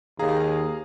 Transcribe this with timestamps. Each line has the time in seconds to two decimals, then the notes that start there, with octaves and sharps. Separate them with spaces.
0.19 D#2 G#4 F5 A#5